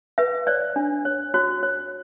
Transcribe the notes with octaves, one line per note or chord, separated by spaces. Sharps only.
B4 E5
C#5 D5
D4
C#5
F#4 C#5
C#5